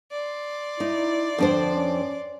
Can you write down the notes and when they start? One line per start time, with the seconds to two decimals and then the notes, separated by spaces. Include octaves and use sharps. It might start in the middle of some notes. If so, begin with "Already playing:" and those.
0.11 D5 C6
0.80 D#4 E4
1.38 F2 D3 D4 C5
1.74 C#4